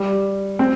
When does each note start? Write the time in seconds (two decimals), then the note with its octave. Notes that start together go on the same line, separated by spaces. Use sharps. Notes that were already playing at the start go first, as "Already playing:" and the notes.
Already playing: G3
0.59 C4